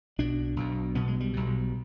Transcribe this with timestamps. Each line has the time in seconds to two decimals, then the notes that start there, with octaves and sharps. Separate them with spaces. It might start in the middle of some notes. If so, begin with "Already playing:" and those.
0.18 B1 B2 D4
0.57 B1 B2
0.95 B1 B2 B3
1.07 G#3
1.20 G3
1.33 B1 B2